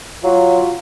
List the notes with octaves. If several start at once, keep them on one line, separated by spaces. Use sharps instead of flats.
F#3 F4